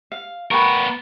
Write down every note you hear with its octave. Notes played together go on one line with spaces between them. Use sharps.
F5
B3 A#4 G5 B5 C#6